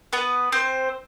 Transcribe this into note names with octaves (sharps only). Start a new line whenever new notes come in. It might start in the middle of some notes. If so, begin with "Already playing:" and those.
B3 B4
C4 C5